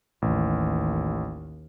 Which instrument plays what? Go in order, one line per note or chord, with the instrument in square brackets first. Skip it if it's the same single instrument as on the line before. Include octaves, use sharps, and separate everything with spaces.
[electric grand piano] A1 [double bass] D#2